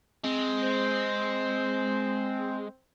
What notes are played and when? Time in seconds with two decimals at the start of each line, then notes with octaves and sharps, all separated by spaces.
0.24 G#3 C4
0.63 C5